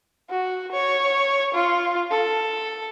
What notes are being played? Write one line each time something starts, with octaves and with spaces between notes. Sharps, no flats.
F#4
C#5
F4
A4